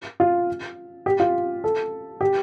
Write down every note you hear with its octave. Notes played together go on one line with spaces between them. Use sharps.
F4
G4
F4
A4
G4